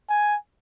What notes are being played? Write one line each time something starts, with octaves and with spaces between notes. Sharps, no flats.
G#5